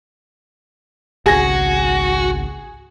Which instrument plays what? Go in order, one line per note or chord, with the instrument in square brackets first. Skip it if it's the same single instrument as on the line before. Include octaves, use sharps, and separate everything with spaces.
[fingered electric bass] G#1 C#2 [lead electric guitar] F#4 [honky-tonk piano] G#4 A#6